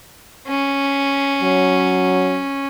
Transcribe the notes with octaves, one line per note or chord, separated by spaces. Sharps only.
C#4
F#3